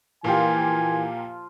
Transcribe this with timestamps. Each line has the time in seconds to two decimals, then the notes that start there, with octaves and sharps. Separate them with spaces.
0.24 A#2 E3 F3 A#3 F4 G4 G#5